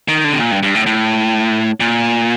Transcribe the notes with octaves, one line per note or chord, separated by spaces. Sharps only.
D#3
D3
C3
A#2
G2
G2
A2
A2
A#2